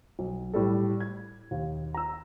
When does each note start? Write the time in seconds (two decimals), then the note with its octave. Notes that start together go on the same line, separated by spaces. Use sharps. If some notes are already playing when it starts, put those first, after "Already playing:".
0.19 B1
0.54 A2 G3 A4
1.00 G#6
1.51 D#2
1.94 A#5 E6